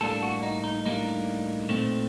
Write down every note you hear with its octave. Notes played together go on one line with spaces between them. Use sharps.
A2 G3 A#3 D4 A4
F#4
D#4
D#4
A2 G3 A#3 D4 D#4
A#2 A3 C4